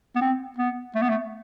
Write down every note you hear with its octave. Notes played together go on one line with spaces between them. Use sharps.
B3
C4
B3
A3
B3
A3